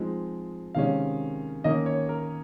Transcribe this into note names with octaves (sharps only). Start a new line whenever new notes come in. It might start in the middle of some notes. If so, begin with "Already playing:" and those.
Already playing: F3 G#3 C4 D#4
C3 D#3 G#3 C#4 F5
D#3 A#3 C#4 D#5
C#5
A#4